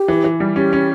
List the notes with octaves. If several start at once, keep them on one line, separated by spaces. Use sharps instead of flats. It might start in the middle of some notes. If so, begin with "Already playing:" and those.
Already playing: G4
E3
E3
G3
C#4 G4
C#4